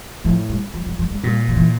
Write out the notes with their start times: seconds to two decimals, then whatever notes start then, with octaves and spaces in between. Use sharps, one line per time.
0.24 A2 F3
0.49 G3
0.74 F3
0.86 F3
0.99 F3
1.11 G3
1.24 A#2 G3
1.49 F3
1.56 E3